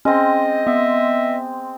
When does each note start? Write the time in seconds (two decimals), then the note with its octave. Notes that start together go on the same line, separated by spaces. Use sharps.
0.05 G#3 C4 C#4 D#5
0.67 B3 E5